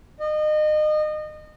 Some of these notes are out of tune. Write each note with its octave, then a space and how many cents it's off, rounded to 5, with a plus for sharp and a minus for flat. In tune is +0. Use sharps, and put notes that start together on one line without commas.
D#5 -30